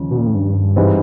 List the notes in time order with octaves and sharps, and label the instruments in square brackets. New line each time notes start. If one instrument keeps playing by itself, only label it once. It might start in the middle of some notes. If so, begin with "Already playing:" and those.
Already playing: [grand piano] D#2 C#3 F3 G#3 C#4
[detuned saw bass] B2
A#2
A2
G2
[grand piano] G#2 E3 G3 C4